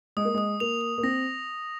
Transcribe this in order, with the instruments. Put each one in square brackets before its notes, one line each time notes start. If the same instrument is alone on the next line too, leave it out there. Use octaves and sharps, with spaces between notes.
[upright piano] G#3 [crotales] D#6
[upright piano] A#3
[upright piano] G#3 [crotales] D#6
[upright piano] A#3 [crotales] F7
[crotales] F7
[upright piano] A#3
[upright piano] C4 [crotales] A#6